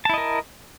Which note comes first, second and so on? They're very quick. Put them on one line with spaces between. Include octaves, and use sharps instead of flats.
A5 E4 D#5 A#4